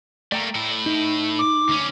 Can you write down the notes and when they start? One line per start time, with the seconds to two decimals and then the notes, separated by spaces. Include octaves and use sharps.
0.32 A3 A#3 D5 G5 A#5
0.55 A2 E4
0.86 D#4
1.38 D6
1.69 D2 C#4